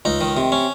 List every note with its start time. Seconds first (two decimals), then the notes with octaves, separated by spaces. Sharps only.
0.05 C#2 D#4
0.21 D#3
0.37 C3
0.52 C#4